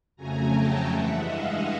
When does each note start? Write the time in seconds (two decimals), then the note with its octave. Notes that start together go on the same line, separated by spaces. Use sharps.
0.16 F2 C#3 F#3 A3 G#5 A#5
0.52 G5 A5
0.88 G2 E3 G#3 E5 F#5
1.24 D#5 F5